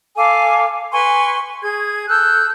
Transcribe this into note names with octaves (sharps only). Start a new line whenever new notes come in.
A4 F5 G#5 D6
B4 G#5 C6 C#6
G#4 G#6
A4 E6 F#6 G6